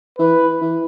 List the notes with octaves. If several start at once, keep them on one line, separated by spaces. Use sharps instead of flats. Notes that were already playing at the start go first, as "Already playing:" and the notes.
E3 B4
E3